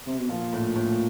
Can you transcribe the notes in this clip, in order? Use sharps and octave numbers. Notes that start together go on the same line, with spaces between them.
C3
B2
A#2 F3
A2
A2